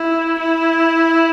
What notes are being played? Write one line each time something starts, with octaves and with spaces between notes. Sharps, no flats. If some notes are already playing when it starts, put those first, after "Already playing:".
Already playing: E4
E4